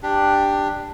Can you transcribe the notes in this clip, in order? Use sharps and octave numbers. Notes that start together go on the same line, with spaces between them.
D4 G4